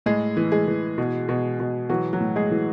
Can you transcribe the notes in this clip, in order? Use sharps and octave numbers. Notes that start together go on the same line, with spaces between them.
A2 G#3 G#4
E3
G#3 G#4
E3
B2
B2
B2
E3 F#3 F#4
F#3 F#4
A2
G#3 G#4
E3